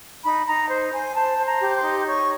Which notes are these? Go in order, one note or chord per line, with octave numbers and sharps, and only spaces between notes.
D#4 B5
D#4 A#5
C5
C5 G#5
C5 A5
C5
A#5
G4
C6
D#4
C#5 C#6